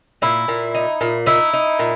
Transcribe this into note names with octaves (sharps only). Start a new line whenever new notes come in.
A#2 E4
A#2
D#4
A#2
D#4 E4
D#4
A#2